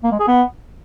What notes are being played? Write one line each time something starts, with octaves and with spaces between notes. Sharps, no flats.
A#3
G#3
G#4
B3